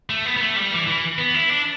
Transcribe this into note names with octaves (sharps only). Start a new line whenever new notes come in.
A3
B3
B3
A3
G3
E3
E3
B3
E4
D4